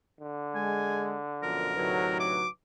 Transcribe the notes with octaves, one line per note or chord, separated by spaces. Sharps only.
D3
G#3 G#5
F#2 B2 F3 A#4
D2 A2 C3 F#3 D#4 B4
D6